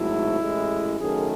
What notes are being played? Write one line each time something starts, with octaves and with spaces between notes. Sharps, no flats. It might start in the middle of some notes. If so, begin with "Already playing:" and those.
Already playing: G#1 G#2 F#3 A3 E4
A1 A2 G#3
F#2 D#3 A3 G#4